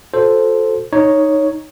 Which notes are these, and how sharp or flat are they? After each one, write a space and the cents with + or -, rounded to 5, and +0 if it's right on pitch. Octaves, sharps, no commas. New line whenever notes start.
F#4 -35 A4 +0 C5 +0
D#4 +0 C#5 +0